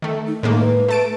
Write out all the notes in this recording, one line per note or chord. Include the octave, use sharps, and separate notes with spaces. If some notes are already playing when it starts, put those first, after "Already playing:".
D#3 A3
D#4
A2 G#3 A#3
B4
A3 A5 D7